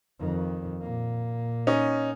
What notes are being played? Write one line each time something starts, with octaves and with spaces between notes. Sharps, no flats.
F2 D#3
A#2 A#3
C#4 D#4